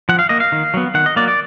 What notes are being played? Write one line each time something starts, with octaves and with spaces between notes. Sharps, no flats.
F3 F#5
F5
A#3 D#5
F5
D#3
F#3 B3
D#3 F#5
D#5
F#3 A#3 D5
D5